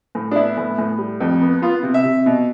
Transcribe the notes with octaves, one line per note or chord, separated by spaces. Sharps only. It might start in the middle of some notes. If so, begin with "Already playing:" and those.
A2
D4
B3 E4
A2
A2
G3
F2
B3
B3 F4
C3
E5
C3
B2